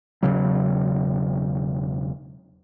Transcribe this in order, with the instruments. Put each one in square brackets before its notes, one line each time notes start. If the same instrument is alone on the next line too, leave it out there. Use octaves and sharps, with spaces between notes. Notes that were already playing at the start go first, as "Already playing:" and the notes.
[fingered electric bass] E1 C#2 C#3 F#3